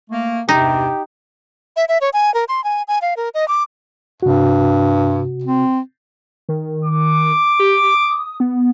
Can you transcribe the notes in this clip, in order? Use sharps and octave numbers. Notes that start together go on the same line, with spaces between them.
A3 A#3
E2 G2 C3 D#4 G4
E5
E5
C#5
G#5
A#4
C6
G#5
G#5
F5
A#4
D#5
D6
G2 C3 F#4
C4
D#3
D6
G4
D#6
B3